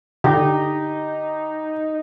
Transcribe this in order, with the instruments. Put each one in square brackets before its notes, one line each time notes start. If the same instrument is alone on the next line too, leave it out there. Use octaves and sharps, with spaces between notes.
[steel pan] D3 [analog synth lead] D#4 [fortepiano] G4